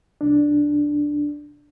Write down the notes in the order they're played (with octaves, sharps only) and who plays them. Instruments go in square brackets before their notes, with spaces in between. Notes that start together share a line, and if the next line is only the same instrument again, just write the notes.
[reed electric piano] C2 D4